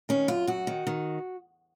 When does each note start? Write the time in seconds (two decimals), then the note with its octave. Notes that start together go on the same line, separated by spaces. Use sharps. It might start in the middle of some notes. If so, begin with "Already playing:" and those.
0.09 D#3 C#4
0.28 F#2 F4
0.47 F#2 F#4
0.67 D#3
0.87 D#3